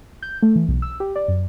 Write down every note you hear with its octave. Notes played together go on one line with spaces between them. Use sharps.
G6
A3
E3
B1
E6
G4
D5
F#2